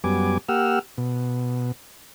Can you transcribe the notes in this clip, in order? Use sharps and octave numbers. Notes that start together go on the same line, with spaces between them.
F#2 G3 B3 G#5 D6
A#3 G4 F#5 E6 F6
B2